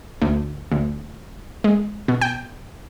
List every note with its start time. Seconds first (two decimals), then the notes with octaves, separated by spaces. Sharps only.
0.22 D2
0.72 D2
1.64 G#3
2.08 B2
2.22 G5